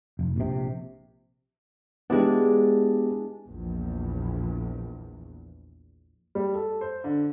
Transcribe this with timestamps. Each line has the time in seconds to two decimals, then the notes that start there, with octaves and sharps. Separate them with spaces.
0.19 F1
0.36 A#1 C3
2.10 G#3 B3 D4 E4 G4
3.47 A#1 E2
6.35 G3
6.54 A4
6.81 C5
7.04 D3